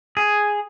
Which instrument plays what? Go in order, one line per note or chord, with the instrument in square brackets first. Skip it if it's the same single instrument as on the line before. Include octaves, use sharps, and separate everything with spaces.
[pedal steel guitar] G#4